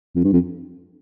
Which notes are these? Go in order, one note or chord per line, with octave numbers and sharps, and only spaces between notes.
F2
G2
F2